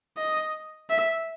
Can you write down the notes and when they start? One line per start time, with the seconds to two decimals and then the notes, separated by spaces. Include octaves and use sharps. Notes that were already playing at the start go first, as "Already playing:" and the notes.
0.17 D#5
0.90 E5